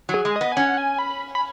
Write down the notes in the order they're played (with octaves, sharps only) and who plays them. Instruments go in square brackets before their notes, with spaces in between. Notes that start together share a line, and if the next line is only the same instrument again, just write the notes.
[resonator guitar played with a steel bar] F#3
[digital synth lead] G#4
[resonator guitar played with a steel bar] G#3
[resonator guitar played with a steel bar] B3 [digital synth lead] D#5
[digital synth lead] G#5
[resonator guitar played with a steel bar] C#4 [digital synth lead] F#5
[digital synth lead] G#5
B5
B5